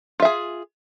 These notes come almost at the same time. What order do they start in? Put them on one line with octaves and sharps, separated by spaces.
F4 E5 G#4